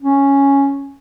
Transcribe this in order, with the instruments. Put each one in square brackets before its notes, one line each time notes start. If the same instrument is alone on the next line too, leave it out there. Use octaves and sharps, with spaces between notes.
[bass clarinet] C#4